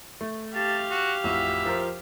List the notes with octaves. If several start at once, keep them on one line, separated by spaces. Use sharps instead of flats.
A3
G4 F5 A5
F#4
A1 F2 F#4 E5
F3 A#4 C5